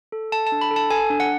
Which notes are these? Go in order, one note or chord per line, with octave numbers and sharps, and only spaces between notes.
A4
A4 A5
A5
D4
B5
A4
A5
A4 G#5
D4
F#5